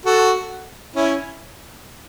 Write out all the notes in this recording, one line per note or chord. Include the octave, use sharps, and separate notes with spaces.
F#4 A4
C#4 E4